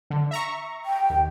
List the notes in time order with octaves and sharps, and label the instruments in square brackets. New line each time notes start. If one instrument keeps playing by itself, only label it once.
[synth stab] D3
E5 A#5 C#6
[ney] G5
[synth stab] D#2